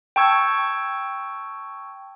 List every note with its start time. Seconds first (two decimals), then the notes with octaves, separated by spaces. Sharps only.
0.16 G5 A5 C#6 E6 G#6